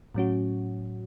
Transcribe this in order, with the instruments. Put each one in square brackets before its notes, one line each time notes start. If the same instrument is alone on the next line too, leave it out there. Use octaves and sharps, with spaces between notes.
[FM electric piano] A2 F#3 C#4 F#4